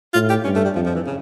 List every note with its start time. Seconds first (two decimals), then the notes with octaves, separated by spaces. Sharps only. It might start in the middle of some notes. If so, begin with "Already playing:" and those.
0.14 A2 F4
0.30 G4
0.44 G2 C#4
0.56 A3
0.65 G3
0.75 F2 F3
0.86 F3
0.96 E3
1.06 C#3